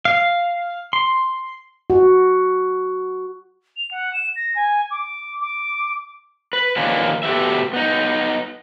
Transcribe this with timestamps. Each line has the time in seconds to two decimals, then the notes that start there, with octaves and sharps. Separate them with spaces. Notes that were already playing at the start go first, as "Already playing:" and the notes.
0.05 F5
0.93 C6
1.90 F#4
3.76 F7
3.91 F#5
4.13 E7
4.36 A#6
4.55 G#5
4.91 D6
5.41 D6
6.53 B4
6.77 D#3 F3 A#3 C#4 D4 B4
7.23 B2 A3 F#4 G4 B4 E5
7.73 B3 D#4